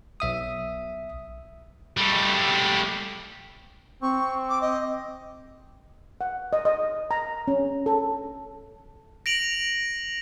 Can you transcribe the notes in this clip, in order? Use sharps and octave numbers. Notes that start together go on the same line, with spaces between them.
B1 E5 D#6
G3 A3
C4 C#6
D6
D#5
F#5
D#5
D#5
A#5
C#4
A4
A#6 D7 F7 F#7